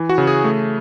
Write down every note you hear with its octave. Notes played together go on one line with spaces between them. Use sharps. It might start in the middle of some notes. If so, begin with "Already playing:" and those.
Already playing: E3
F#4
C#3
G#4
A3